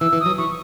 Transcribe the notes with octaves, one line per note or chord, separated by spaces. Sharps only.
E3 E6
E3
D#6
F#3
E3 C#6